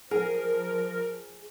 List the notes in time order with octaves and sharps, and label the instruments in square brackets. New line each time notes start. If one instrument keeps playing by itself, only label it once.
[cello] F3 [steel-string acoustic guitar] G#4 [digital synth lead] A#4